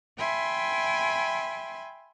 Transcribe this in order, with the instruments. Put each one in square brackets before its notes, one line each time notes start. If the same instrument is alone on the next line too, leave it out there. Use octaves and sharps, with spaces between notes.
[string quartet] E5 G5 G#5 B5 C6